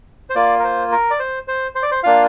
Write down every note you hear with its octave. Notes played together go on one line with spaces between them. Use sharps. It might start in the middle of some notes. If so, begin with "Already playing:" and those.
C5
A#3 F4 D5
A#4
C5
A#4
D5
C5
C5
C5
D5
C5
A#3 D4 F4 F5